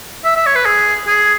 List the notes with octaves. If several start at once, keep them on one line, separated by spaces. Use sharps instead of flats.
E5
E5
C#5
B4
G#4
G#4